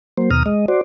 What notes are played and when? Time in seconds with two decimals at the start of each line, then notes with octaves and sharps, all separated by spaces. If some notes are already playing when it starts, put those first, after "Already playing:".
0.18 F#3 A#3 C5
0.31 D#2 B2 A#5 D#6 F6
0.46 G#3 D#5
0.68 F#4 C5 D5